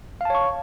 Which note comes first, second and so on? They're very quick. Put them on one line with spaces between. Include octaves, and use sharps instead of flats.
F5 A5 C#5 C#6